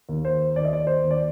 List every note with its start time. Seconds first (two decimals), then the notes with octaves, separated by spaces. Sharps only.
0.09 D#2
0.25 C5
0.56 D#2 D5
0.65 D#5
0.73 D5
0.87 C5
1.03 D#2
1.11 D5